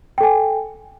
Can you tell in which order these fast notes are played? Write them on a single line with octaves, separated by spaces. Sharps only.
G5 A4 G#5